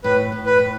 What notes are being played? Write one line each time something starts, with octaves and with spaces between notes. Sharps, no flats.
A2 B4
A2
B4
A2